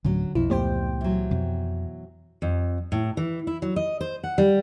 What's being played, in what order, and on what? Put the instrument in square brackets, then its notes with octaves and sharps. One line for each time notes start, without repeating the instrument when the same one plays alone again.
[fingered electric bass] D1 A2 [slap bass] D3 [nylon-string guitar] F#3 C#4
[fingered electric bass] B1 B2 F3 [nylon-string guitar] F2 [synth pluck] E4
[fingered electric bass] C#2 A#2 F3 [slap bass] A3 B3 [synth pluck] G4 C5 G5
[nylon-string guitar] E3 F#3
[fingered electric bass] F2 [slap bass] B2
[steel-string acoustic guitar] F2
A2
E3
E4
F#3
D#5
C5
F#5
G3